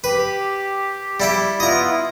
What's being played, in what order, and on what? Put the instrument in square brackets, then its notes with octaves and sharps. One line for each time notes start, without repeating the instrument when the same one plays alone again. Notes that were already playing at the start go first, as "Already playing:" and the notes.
[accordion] G4 [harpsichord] B4
[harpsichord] G3 E4 G5
[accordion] B3 E4 F4 [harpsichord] D#5 A#5